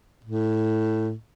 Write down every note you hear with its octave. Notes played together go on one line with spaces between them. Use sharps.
A2